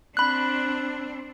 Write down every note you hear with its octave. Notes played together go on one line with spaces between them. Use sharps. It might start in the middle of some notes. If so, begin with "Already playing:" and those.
C4 D4 B5 F#6